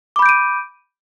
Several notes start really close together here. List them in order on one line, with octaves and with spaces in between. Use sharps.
D6 B5 G6 D7 D#7